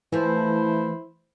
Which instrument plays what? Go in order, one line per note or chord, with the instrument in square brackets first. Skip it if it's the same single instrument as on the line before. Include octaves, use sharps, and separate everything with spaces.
[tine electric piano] E3 [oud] F3 A3 [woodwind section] E4 C5